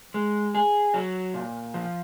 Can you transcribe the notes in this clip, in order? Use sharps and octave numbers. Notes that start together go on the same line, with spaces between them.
G#3
G#4
F#3
A#2
F3